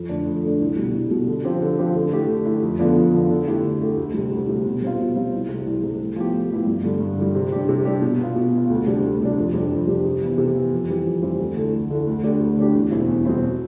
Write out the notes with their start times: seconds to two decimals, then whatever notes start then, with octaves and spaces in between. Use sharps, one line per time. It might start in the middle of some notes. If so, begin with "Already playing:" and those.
Already playing: F2
0.09 D3 A3 D4
0.26 F2
0.43 D3 A3 D4
0.60 C2
0.76 B2 G3
0.94 C2
1.11 B2 G3
1.27 D3
1.44 F3 C4 G4
1.61 D3
1.79 F3 C4 G4
1.95 D3
2.12 A3 E4 G4
2.28 D3
2.46 A3 E4 G4
2.63 F2
2.79 D3 F3 B3 D4
2.97 F2
3.13 D3 F3 B3 D4
3.30 D3
3.47 A3 E4 G4
3.63 D3
3.81 A3 E4 G4
3.97 D2
4.14 C3 G3
4.32 D2
4.48 C3 G3
4.65 B2
4.82 G3 C4 F4
4.99 B2
5.16 G3 C4 F4
5.33 C2
5.49 C3 G3
5.66 C2
5.83 C3 G3
6.00 A2
6.16 F3 B3 E4 G4
6.33 A2
6.50 F3 B3 E4 G4
6.67 G2
6.84 D3 G3
7.01 G2
7.17 D3 G3
7.35 C3
7.52 G3 D4 G4
7.69 C3
7.85 G3 D4 G4
8.02 B2
8.19 B3 F4
8.36 B2
8.52 B3
8.58 F4
8.70 D2
8.87 C3 G3 D4
9.04 D2
9.21 C3 G3 D4
9.38 F2
9.53 C3 G3 D4 G4
9.71 F2
9.87 C3 G3 D4 G4
10.05 C3
10.22 E3 B3 E4
10.38 C3
10.55 E3 B3 E4
10.72 F2
10.89 E3 G3 C4 G4
11.06 F2
11.22 E3 G3 C4 G4
11.39 D2
11.57 D3 A3 E4
11.73 D2
11.90 D3 A3 E4
12.07 D2
12.23 D3 A3 D4 G4
12.40 D2
12.57 D3 A3 D4 G4
12.74 E2
12.91 B2 G3 C4 E4
13.08 E2
13.25 B2 G3 C4 E4